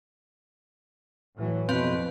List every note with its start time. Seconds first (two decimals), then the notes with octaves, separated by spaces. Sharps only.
1.36 A2 E3 F#3
1.69 F2 B2 C4 B4 F5